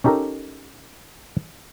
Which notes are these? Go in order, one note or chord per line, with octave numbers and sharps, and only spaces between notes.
C#4 D#4 G4 A4 A#4